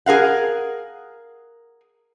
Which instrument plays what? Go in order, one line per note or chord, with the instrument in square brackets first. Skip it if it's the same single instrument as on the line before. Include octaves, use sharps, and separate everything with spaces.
[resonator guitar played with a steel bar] G#4 A#4 F5 F#5